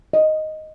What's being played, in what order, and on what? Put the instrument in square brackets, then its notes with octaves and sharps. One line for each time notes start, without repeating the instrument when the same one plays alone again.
[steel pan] D#5